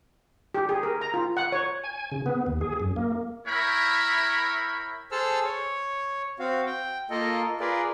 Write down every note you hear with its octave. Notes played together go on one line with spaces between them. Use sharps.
G4
G#4
A#4
A#5
F4
F#5
C#5
G#5
C#3
B3
D#2
G#4
F#2
A#3
E4 A#4 C#5 E5 G5 B5
G#4 A4 C5 A5 E6 F6
C#5
C4 F#4 F5
G5
A#3 F4 A4 A#4 D#5
F4 G#4 A#4 B4 D5